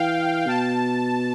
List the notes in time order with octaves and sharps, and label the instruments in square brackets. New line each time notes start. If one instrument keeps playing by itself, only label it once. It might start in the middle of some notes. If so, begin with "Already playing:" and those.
Already playing: [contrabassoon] E3 [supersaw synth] F5 G5
[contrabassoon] B2 [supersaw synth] A5